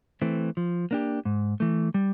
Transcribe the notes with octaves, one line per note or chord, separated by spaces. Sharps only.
E3 A3 C4
F3
A#3 D4 G4
G#2
E3 A3
G3